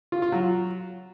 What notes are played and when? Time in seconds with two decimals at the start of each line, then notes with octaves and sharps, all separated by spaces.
0.12 F4
0.22 F4
0.32 F#3